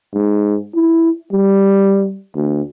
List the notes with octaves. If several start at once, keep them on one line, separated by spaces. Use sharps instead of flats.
G#2
E4
G3
D2